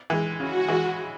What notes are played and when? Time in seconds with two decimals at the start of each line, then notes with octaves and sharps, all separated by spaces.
0.10 E3 G#3
0.39 C#3 F#4
0.68 E3 G#3